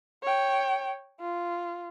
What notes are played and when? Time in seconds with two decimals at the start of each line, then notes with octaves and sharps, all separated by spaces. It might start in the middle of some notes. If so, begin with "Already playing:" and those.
0.23 C#5 G5
1.21 F4